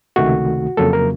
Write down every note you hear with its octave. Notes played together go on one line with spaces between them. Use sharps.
C#2 C3 D#3 A3 F#4
F2 C#3 F#3 A#3 A4
A#4